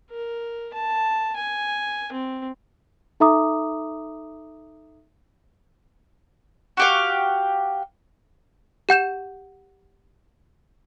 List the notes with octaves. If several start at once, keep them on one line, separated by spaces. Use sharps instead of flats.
A#4
A5
G#5
C4
D#4 A4 E5 A#5 D6 D#6
F#4 G4 F5
G4 F#5 G6 E7